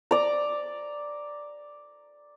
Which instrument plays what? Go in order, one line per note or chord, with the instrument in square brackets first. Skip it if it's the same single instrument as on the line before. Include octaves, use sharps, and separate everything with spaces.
[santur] D5 A#5